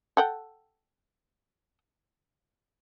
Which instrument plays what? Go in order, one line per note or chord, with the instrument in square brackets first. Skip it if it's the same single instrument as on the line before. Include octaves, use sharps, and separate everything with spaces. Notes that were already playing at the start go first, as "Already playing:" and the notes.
[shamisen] A4 F#5 G5